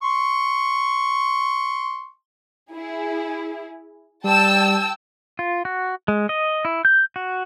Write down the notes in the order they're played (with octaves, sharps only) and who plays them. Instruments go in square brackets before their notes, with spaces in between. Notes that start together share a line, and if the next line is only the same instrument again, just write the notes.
[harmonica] C6 C#6
[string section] E4 G#4
[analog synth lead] G3 [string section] G5 A5 E6
[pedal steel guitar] F4
F#4
G#3
D#5
E4
G6
F#4